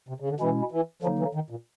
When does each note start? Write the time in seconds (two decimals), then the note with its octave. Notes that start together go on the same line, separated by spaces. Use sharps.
0.08 C3
0.20 C#3
0.30 D3
0.40 B2 E3 G#3 C#4 E4
0.72 E3
1.02 D3 F3 F#3 A#3 D#4
1.19 E3
1.35 D#3
1.50 A#2